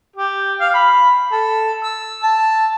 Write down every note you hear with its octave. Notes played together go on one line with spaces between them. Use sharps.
G4
F5
B5
A4
E6
A5